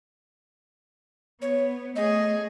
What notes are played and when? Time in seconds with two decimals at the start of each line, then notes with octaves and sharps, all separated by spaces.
1.42 B3 C#5
1.96 A3 G#4 D#5